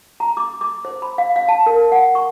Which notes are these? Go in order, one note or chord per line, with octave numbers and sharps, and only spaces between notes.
A#5
D6
D6
C5
B5
F5
F5
A5
A#4
F#5
C#6